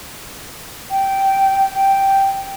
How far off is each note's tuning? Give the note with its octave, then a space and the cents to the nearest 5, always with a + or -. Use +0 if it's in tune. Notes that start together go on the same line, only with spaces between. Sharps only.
G5 -15
G5 -5